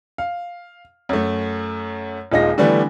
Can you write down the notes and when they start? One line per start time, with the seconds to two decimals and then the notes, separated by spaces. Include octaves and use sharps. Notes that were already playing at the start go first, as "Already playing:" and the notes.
0.18 F5
1.09 F#2 A3
2.32 D#1 A#2 G#3 D#4 F4 A#6
2.58 D3 E3 G3 A3 B3 D4